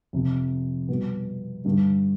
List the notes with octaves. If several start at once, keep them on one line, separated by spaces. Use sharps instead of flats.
F2 C3 F3
B2 G3 B3
G2 D3 G3